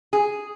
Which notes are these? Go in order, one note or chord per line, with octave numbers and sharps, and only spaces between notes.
G#4